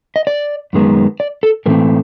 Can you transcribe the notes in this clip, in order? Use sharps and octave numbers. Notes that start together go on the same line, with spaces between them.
D#5
D5
F#2 D#3 G#3 B3
D5
A4
A2 E3 A3 C4 A#4